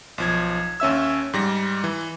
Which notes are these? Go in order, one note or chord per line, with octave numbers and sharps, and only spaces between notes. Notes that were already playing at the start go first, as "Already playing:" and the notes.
B1 F3 G#6
D#2 C#4 E5 E6
G#2 G3 A#6
E3